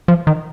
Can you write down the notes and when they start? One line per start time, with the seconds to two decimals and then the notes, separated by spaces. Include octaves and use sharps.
0.08 F3
0.27 D#3